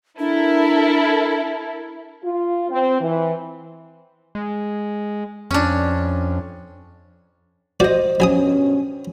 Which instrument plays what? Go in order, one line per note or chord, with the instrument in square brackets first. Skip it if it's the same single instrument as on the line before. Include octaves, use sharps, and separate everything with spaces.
[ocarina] D4 [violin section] E4 A4 A#4
[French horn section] F4
C4
E3
[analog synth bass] G#3
[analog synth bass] F2 [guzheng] C#4 D4
[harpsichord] F#4 D5 [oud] C5 D#5
[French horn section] G2 B2 C#4 [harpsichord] F#3 G#5 D#6